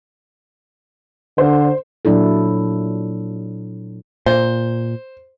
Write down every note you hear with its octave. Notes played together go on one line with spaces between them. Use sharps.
D3 C5
A#2 F#3 D4 E4 A4
A#2 C5